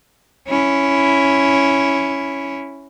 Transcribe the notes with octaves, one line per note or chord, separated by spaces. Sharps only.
C#4 E4